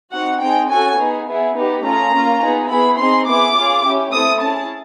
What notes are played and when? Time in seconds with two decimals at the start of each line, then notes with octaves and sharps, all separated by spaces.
0.12 C4 D#4 F#4 F#5
0.40 C4 D#4 G#4 G5
0.69 C#4 F#4 A4 G#5
0.97 B3 D#4 G#4
1.26 B3 E4 G#4
1.55 B3 D#4 G4
1.83 A3 C#4 F4 G#4 A#5
2.12 A#3 C#4 F4
2.41 B3 D#4 G#4
2.69 B3 E4 G#4 B5
2.98 C4 D#4 G#4 C6
3.27 B3 E4 G#4 D6
3.55 C#4 F4 G#4
3.84 C#4 E4 G4
4.12 A3 C4 E4 A4 D#6
4.41 C#4 E4 G#4 A5